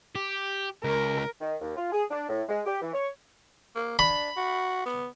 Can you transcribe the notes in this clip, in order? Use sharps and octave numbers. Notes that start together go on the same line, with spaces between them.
G4
C#2 A#4
D#3
D#2
F4
G#4
D4
A2
G#3
G4
E3
C#5
A#3
D4 B5
F#4
B3